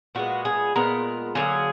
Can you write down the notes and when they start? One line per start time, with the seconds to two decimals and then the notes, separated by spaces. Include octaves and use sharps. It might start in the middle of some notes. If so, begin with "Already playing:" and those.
0.15 A#2 G#3 B3 F#4
0.45 G#4
0.76 A#2 G#3 B3 A#4
1.35 D3 F#3 A#3 G#4